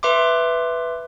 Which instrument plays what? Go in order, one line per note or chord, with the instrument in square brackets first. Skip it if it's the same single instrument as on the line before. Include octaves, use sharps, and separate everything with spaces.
[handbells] B4 E5 C6 D6